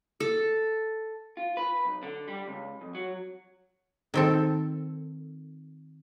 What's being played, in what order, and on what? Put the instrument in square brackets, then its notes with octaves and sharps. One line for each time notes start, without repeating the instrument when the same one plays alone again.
[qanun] A4
[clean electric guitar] F4
B4
B1
D3
G3
C#2
F2
F#3
[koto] D#3 C4 A4